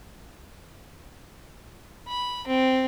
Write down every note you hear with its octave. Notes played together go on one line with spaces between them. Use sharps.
B5
C4